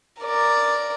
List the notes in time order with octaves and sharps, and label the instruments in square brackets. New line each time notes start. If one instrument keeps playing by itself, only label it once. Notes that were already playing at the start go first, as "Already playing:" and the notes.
[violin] A#4 D5